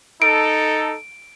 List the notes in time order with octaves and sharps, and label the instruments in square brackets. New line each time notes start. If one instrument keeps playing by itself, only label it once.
[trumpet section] D#4 A4 [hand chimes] D7